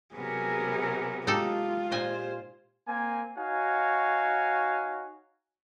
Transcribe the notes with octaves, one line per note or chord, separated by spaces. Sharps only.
C3 F#3 B3 G#4 A#4
G#3 D#4 F4 G4 A4
A#2 C5 D#5 G#5
A#3 C4 G#5
D#4 F#4 C#5 F5 G#5